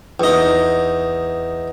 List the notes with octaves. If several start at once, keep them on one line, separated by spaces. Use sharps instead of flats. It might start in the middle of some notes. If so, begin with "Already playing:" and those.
E2 D#4